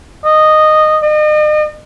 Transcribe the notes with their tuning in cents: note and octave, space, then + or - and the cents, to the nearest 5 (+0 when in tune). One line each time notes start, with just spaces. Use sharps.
D#5 -10
D#5 -40